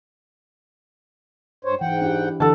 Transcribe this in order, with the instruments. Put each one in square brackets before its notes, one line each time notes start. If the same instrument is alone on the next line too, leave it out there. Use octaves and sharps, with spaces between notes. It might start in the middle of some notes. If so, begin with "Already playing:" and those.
[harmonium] G2 C5 C#5
[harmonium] G#2 F#5 G5 [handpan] E3
[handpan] D4 E4 G4
[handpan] D3 E3 D4 [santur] A4 F#5 A5